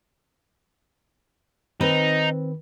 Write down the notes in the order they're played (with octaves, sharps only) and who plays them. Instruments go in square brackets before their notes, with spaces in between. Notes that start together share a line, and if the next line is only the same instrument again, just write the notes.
[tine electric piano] D#3 [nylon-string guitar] C4 B4 [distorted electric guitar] D#4